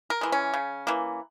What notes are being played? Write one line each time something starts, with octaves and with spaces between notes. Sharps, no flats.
A#4
E3 G#3
C#4
C#3
E3 A#3